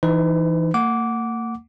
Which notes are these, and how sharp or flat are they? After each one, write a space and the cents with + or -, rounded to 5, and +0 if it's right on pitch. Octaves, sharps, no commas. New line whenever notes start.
E3 +0 D#4 +0 B4 +40
A#3 -40 F#5 +0 D6 -15